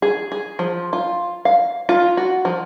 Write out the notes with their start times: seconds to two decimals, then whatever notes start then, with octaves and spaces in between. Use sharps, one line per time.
0.02 G#4
0.32 G#4
0.59 F3
0.93 F4
1.45 F5
1.89 F4
2.17 F#4
2.45 F3